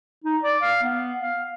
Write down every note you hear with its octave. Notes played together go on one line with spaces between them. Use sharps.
D#4
D5
F5
B3
F5